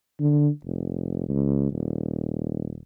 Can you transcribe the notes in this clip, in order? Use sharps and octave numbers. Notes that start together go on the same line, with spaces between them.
D3
F1
C#2
D#1